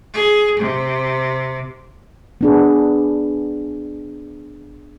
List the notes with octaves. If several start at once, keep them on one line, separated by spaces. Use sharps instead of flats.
G#4
C3
B3 D4 G#4